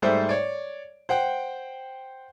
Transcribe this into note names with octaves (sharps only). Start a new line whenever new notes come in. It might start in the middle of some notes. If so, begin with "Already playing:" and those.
G#2 G3 A3 A4 C5 E5
C#5 D5
C5 F#5 G5